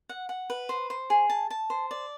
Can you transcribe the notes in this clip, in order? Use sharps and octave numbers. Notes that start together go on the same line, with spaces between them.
F#5
F#5
B4
C5
C5
G#4
A5
A5
C5
D5